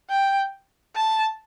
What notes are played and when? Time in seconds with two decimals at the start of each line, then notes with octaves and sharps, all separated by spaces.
0.10 G5
0.96 A5